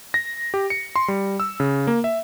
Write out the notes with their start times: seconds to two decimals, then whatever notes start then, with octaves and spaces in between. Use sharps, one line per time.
0.14 A#6
0.54 G4
0.70 C#7
0.96 C6
1.08 G3
1.40 E6
1.60 C#3
1.87 A#3
2.04 E5